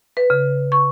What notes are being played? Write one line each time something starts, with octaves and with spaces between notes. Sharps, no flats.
B4
C#3
C#6